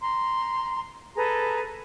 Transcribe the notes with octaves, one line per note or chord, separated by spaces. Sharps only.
A#5 C6
G#4 A4 B4 A#5